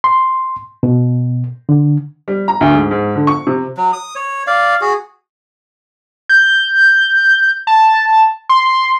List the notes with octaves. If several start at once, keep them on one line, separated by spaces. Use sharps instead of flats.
C6
B2
D3
G3
A#5
D2
G#2
G#2
D3
C#6
C3
F#3
D#6
C#5
D5 F5
F#4 G#4
G6
A5
C6